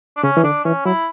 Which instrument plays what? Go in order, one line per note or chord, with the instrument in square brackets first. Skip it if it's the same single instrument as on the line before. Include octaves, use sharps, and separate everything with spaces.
[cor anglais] D4
[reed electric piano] C#3 [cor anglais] C#4
[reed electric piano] E3
[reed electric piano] D3 [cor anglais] D4
[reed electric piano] E3 [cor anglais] C#4
[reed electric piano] F#3 [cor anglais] E4